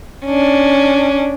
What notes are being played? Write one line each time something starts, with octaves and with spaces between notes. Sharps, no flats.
C#4 D4